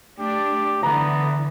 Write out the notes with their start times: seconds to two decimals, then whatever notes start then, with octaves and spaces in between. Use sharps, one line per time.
0.19 A3 D4 G4
0.83 D3 E3 B3 A#5